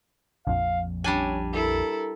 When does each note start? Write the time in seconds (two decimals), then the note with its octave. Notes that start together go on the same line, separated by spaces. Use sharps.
0.47 A#1 F2 F5
1.04 G3 C#4 D4 G#5
1.53 E4 A4 A#4